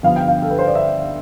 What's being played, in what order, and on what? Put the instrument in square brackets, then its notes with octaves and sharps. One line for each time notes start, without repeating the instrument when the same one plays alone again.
[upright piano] G1 G2 F3 B3 F5
G5
F5
A4
B4
C5
D5
E5